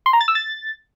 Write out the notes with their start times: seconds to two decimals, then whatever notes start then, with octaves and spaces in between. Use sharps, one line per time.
0.06 C6
0.13 A#5
0.21 A6
0.28 E6
0.35 A6